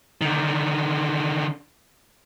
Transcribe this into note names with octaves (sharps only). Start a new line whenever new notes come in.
D3 D#3